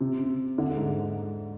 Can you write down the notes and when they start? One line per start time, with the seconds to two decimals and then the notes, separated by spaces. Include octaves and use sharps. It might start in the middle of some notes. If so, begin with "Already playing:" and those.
0.01 C3
0.58 D3
0.77 G#2